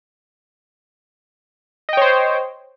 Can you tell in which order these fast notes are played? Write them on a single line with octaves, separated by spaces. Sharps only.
D#5 G5 C#5 C5